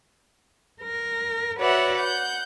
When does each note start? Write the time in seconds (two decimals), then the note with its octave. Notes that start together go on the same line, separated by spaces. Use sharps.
0.81 A#4
1.58 F#4 B4 C#5 D5 E5 F#5
1.97 F#5 G6